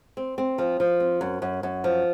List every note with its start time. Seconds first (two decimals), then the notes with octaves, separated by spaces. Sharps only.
0.17 C4
0.38 C4
0.58 F3
0.80 F3
1.00 C4
1.21 F#2
1.42 F#2
1.63 F#2
1.84 F3